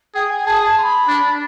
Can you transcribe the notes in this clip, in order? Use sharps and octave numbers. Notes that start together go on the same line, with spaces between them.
G#4 G5
G#5
G#4 A5
A5
C6
B5
D4